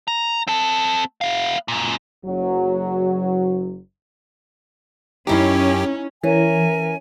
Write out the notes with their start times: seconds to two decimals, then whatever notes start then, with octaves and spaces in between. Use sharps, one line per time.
0.08 A#5
0.47 C4 A4
1.21 B3 F5
1.68 F#2 A#2
2.26 F#1 F#3
5.27 F#2 C#4 D#4 E4 G4 C6
6.24 E3 C#4 A#4 E5 G#5